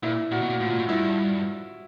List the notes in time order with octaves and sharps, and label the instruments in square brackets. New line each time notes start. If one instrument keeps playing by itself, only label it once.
[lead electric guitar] A#2 [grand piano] E4
[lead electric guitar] A#2 [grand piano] F#4
[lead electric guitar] B2
A#2
[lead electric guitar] A2 [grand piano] F4
[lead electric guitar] A#2
A2
[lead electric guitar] G2 [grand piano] E4